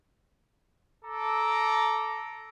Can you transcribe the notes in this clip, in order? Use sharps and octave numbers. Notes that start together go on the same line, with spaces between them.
A4 A#5 D6